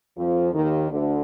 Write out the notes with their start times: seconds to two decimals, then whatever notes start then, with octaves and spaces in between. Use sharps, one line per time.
0.16 F2 F3
0.54 D#2 D#3
0.91 D2 D3